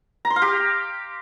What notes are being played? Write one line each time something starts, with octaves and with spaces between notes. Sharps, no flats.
A#5
C6
F5
G4